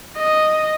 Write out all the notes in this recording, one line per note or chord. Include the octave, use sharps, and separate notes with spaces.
D#5